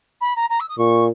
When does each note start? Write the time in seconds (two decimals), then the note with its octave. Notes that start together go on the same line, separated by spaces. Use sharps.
0.21 B5
0.36 A#5
0.49 A#5
0.60 E6
0.69 D#6
0.78 A#2 C#6